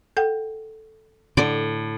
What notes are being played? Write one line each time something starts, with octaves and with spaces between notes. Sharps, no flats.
A4 F#5 G5
A2 D3 D5